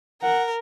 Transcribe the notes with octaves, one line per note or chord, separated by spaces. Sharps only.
A#4 F#5